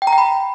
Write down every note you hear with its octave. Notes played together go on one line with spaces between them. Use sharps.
G5
A#5
G5
B5